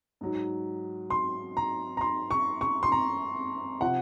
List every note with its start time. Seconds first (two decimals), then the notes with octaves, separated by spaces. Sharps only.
0.21 G#2 F#3
1.10 C6
1.57 A#5
1.97 A#5
2.01 C6
2.31 C#6
2.61 C#6
2.83 C6
2.92 A#5
3.81 C3 F3 F#5